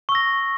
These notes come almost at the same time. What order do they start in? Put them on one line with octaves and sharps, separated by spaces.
C#6 E6 A#6